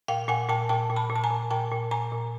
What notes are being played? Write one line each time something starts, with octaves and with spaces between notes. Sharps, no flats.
A#2 F5 G5
A#2 F#5 G#5
A#2 G5 A5
A#2 G5 A5
A#2
A5 B5
A#2
A5
G#5 A#5
A#2
A#2 G5 A5
A#2
A#2 G#5 A#5
A#2